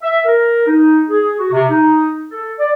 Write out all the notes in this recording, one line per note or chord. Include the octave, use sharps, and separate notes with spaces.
E5
A#4
D#4
G#4
F#4
C3
D#4
A4
D5